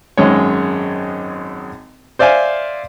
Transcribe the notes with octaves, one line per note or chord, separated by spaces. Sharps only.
G#1 F#2 G#3 C#5
C5 D5 E5 F5 G#5